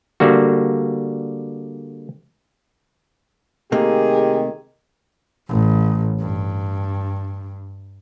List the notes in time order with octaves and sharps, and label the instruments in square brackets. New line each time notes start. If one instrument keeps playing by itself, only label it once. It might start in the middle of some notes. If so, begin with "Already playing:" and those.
[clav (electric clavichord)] D3 G3 A#3 F#4
[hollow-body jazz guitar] C3 A3 A#3 [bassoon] D#3 [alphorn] G4 [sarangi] G#4
[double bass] A1
G2